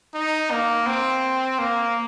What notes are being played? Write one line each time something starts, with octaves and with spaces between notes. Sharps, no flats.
D#4
A#3
C4
A#3